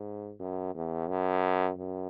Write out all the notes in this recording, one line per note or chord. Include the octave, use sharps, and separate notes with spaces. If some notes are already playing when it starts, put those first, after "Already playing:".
Already playing: G#2
F#2
E2
F#2
F#2